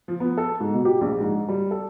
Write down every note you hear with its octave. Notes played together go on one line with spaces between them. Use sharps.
F3
B3
A4
G#2
B2
G4
A#1
G#2
G3
A4